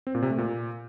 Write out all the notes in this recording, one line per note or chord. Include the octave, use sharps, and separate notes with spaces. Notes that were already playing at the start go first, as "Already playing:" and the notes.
C4
A#2
C3
A3
A#2